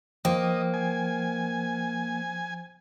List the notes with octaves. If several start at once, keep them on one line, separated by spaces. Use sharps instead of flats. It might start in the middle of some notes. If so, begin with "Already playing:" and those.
F3 A#3 C5 D#5 G5
G#5